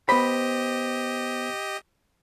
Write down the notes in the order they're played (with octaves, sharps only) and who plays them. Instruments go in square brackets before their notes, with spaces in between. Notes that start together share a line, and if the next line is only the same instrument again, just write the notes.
[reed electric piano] B3 C5 [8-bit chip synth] G4 D#5 [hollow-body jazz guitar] B5